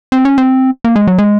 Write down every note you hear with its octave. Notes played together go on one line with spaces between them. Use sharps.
C4
C#4
C4
A#3
G#3
F#3
G#3